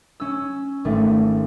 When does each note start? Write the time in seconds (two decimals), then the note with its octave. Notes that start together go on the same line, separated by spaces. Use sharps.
0.20 C#4 E6
0.85 G#1 A3